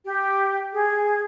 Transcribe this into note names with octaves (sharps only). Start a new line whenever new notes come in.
G4
G#4